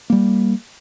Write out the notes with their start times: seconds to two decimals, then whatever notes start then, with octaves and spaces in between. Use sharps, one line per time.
0.10 G3 A#3